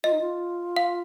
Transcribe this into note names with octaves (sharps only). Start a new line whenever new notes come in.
F4 D#5
D#4
F4
F5